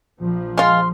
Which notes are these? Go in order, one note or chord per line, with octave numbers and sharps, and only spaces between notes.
A#1 F3
G#3 F4 C6 F6